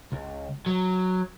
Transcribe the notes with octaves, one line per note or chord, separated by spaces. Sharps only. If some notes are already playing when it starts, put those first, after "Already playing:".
C#2
F#3